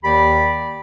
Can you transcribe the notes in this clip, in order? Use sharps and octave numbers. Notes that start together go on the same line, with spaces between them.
D#2 D#3 G4 D5 B5